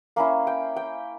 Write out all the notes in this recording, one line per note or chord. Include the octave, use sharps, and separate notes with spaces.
A#3 C#4 E4 F5
G5
G5